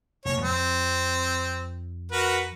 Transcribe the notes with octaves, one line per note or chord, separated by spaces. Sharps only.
F1 A#3 C#5
F2 C4
F#4 A#4 B4